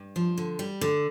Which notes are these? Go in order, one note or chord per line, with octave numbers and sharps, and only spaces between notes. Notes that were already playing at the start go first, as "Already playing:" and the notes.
Already playing: G2
F3
D3
G3
D3